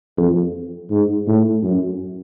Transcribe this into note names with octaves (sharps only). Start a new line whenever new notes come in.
F2
G#2
A2
F#2